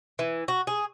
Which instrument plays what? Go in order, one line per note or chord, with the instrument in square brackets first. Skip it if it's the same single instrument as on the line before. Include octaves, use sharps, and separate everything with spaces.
[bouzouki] E3
F#4
G#4